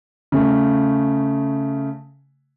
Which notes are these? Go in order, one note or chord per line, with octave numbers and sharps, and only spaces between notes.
C#3 A3